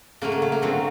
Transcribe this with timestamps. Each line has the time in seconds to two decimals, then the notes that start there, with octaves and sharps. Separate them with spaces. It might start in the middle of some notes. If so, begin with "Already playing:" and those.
0.22 C#3 F#3 A3 A#3
0.32 A#3
0.42 A3
0.52 A#3
0.62 D3 F#3 A3 C4